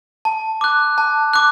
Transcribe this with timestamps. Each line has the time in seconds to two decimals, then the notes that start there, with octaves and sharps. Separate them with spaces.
0.25 A5
0.61 D6 F#6
0.98 A5
1.33 D6 F#6